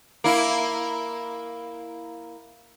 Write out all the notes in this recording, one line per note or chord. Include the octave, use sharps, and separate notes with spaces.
A#3 E4